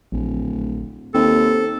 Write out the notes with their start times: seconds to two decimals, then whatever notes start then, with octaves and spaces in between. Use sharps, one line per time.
0.12 D1 A#1
1.15 D#2 C4 A4